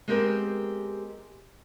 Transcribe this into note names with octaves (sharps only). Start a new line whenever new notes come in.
G#3 B3 C4 G4 A#4